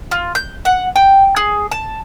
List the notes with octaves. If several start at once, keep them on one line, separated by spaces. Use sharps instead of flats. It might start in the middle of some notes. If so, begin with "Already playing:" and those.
F4
G6
F#5
G5
G#4
A5